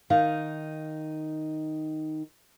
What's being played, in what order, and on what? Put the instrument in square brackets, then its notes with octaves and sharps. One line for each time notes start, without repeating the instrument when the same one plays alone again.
[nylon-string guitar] D#3 D#4 F5